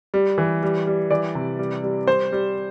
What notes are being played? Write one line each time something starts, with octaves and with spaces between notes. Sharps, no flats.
G3
E3
G3
G3
E3 D5
C3
G3
G3
G3 C5
G3